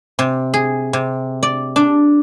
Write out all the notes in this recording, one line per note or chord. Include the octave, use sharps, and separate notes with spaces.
C3
G#4
C3
D5
D4